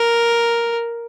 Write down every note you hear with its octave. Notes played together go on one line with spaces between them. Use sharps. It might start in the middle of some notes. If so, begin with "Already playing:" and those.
Already playing: A#4